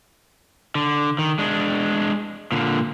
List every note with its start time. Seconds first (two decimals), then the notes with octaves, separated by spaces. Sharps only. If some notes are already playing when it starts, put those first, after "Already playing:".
0.75 D3
1.19 D#3
1.39 G#3 D4
2.52 A#2 D3